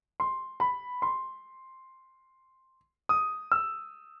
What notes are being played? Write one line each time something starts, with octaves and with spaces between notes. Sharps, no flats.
C6
B5
C6
D#6
E6